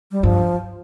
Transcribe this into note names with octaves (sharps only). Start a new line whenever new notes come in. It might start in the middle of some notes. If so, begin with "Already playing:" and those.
G3
G2 F3